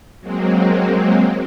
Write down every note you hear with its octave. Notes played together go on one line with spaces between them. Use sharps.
F#3 G#3 A#3 C4